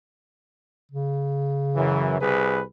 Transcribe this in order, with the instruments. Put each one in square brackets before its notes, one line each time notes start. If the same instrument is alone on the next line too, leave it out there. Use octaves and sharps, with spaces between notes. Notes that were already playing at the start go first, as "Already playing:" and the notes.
[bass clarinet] C#3
[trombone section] F#2 E3
C2 G#4 B4